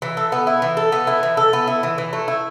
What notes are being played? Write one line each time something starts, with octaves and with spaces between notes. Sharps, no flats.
E3
A4
B3
E4
E3
A4
B3
E4
E3
A4
B3
E4
E3
E3
A3
E4